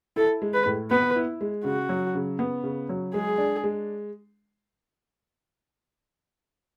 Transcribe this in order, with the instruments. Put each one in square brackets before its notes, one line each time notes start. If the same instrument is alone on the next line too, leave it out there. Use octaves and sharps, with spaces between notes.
[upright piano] E4 [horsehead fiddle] A4
[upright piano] G#3
[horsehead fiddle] B4
[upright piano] A2
[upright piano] B3 [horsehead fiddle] B4
[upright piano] E4
G#3
[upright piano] C#3 [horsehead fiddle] F#4
[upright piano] F#3
C#3
B3
C#3
F#3
[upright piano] G#3 [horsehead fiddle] G#4
[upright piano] D4
G#3